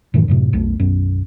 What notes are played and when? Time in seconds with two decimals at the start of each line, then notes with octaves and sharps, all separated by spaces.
0.14 F#2 A2 D#3 E3
0.28 F#2 A2 C3
0.53 B1 F2 A3
0.80 B1 F#2